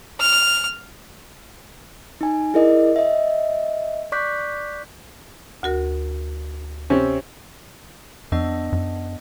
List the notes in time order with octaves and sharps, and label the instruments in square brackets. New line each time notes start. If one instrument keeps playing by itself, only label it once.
[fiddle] F6
[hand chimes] D#4 G#5
E4 G#4 A#4 D5 D#5
D#5 E5
D5 C#6 D6 F#6 G6 B6
[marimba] D2 F#4 A#4
[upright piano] C3 C4 C#4
[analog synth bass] F2 [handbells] B3 D4 D#5
[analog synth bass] F#2